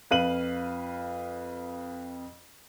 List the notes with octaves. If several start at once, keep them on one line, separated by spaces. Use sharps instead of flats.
F2 B4 F5 D#7 F#7